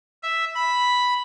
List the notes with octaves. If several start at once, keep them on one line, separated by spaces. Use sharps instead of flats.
E5
B5